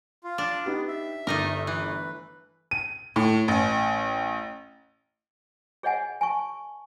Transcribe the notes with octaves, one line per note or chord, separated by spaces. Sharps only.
F4
D4
B3 D#4 G4
E5
G1 A3 D#4 A#4 D6
E3 B4
D#7
A2
A1
G#4 C#5 D#5 F#5 G#5
G#5 A5 C#6